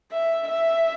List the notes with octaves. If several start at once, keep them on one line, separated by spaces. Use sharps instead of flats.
E5
E5